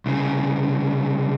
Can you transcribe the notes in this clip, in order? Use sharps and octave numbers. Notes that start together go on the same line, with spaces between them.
C2 C#3